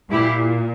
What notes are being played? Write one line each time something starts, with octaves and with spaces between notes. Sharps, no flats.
A#2 E4 G4